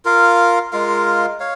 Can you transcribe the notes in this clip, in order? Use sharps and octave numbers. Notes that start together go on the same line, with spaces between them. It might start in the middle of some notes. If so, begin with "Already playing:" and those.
F4 A#4 F5
G#3 F4 A#4 F5
C#5 F5